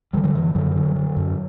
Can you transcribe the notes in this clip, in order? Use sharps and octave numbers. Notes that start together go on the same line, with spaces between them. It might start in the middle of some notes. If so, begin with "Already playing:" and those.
D3 E3 G3
D3 F#3
F#2 E3
F#2 D3 F#3
D3
D3
F#2